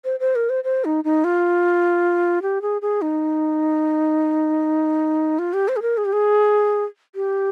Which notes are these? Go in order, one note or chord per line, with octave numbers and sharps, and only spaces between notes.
C5
C5
A#4
C5
C5
D#4
D#4
F4
G4
G#4
G#4
D#4
F4
G4
C5
G#4
A#4
G#4
G4
G#4
G4